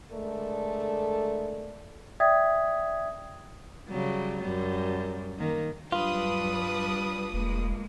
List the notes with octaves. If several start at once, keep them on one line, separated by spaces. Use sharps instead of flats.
D3 G#3 A3 A4 A#4 D5
D5 E5 G5 D#6 G#6 B6
C#3 F#3 G3
F#2 G3
D#3 A#3
G2 F#3 G3 D4 F4 B4 D#6
E1 G#3 A#3